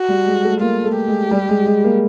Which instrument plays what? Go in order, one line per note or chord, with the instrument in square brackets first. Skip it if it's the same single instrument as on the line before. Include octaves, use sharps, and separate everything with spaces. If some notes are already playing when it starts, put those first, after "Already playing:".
Already playing: [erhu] F#4
[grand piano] G3
G#3
A3
[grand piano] A#3 [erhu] F4
[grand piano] A3
[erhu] G4
[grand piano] G#3
G3
G#3
G#3
A#3